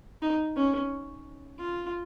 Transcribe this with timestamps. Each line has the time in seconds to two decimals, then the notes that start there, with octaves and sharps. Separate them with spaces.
0.22 D#4
0.56 C#4
1.58 F4